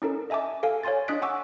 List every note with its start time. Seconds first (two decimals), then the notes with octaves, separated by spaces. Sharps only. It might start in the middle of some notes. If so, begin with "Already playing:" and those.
0.02 C#4 D#4 A4 A#4
0.30 D#5 E5 G#5 A5 D6
0.63 A4 F5 G#5
0.83 C#5 F5 G#5 C6 A6
1.08 D4 D#5 D#6 F#6 B6 D7
1.22 F#5 G#5 C#6 D6 E6